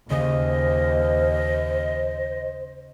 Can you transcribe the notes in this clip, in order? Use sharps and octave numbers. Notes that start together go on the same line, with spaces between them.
D#2 C#3 C5 D#5 D#6